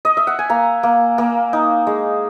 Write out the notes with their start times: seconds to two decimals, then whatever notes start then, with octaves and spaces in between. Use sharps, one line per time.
0.05 D#5
0.17 E5
0.27 F#5
0.39 G#5
0.50 A#3 A#5
0.83 A#3
1.18 A#3
1.53 D#4
1.87 G#3